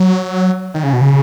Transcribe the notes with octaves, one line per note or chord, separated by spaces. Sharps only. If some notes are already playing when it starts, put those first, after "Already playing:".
Already playing: F#3
D#3
C#3
B2
C#3